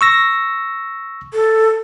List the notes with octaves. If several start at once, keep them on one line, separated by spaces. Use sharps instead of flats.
C#6 E6 A#6
A4